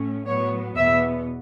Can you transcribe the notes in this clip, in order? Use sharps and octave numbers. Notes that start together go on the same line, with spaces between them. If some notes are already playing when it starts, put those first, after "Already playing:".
Already playing: A2 A3 C#4
A2 F#3 B3 C#5
E2 B2 B3 E5